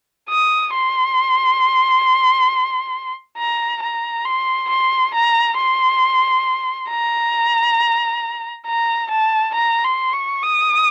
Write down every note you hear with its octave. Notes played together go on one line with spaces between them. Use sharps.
D#6
C6
A#5
A#5
C6
C6
A#5
C6
A#5
A#5
A5
A#5
C6
C#6
D#6